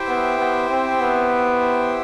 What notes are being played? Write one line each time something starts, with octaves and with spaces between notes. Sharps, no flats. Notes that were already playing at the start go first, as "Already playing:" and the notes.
Already playing: E4 G4 C5 E5 G5
B3
B3
C4
B3